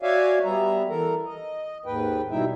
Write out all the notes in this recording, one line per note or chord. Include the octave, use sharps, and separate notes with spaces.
F#4 C#5 D5 E5 F5 G#5
G3 B3 E5 A#5
E3 A4 A#4 A#5
D#5
D#2 G#2 B4 G5
B2 G3 D#4 E4 E5 G5